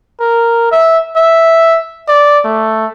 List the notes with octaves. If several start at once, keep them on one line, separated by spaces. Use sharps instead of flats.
A#4
E5
E5
D5
A3